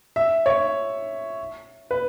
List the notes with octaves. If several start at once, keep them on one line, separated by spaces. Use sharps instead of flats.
E5
C#5
B4